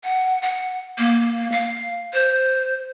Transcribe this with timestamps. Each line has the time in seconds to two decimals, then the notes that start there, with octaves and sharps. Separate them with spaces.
0.04 F#5
0.42 F#5
0.98 A#3
1.52 F5
2.13 C5